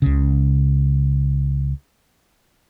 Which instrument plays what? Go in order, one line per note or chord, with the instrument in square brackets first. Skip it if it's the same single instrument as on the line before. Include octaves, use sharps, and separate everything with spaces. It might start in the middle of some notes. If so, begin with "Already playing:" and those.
[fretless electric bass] C#2 C#3